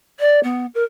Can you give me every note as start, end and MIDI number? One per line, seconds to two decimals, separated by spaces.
0.20 0.40 74
0.43 0.66 59
0.75 0.83 70